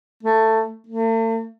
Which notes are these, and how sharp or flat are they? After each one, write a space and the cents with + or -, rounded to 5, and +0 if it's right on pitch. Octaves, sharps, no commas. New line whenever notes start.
A3 +15
A3 +45